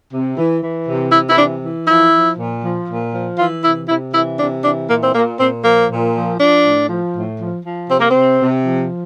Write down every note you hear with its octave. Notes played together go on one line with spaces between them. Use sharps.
C3
E3
E3
C3
C3 E4
E4
E3 D4
E3
F3 E4
F3
A#2
F3
A#2
F3
E3 F4
C3 E4
C3 E4
E3 E4
C3 D4
E3 D4
A#2 A#3
C4
A#2 A#3
A#2 C4
F3 A#3
A#2
F3
F3 D4
A2
F3
A2
F3
F3
C3 C4
A#3
C4
C3
C3
F3